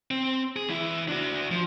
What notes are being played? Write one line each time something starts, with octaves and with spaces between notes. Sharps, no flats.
C4
G#4
E2 E4
D4 F#4
F3